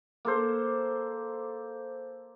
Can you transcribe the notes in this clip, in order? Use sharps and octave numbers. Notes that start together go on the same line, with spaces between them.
A#3 A4 C5